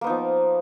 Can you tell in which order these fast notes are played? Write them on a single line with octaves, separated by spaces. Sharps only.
A#3 B3 D#4 F3